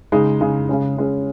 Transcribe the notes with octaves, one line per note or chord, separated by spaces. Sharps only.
C#3 G#3 D#4
C#3 G#3 D#4
C#3 G#3 C#4
C#3 G#3 C#4